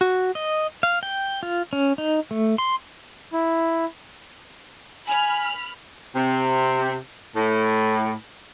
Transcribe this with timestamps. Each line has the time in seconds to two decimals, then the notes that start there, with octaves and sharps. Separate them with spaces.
0.01 F#4
0.35 D#5
0.83 F5
1.03 G5
1.43 F4
1.73 C#4
1.98 D#4
2.31 A3
2.58 C6
3.33 E4
5.08 G#5 B5 F6
6.15 C3
7.36 A2